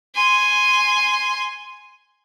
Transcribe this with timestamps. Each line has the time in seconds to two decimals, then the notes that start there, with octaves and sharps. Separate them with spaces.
0.15 G#5 C6